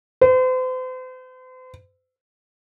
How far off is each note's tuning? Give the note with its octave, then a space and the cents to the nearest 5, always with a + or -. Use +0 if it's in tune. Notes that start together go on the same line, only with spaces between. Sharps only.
C5 -40